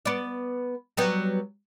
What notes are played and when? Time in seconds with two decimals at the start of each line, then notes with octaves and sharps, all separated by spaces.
0.05 B3 D5
0.97 F#3 G3 B3